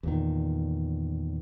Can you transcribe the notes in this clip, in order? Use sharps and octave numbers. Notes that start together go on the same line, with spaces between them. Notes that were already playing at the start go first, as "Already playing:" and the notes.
E2 A#2 D#3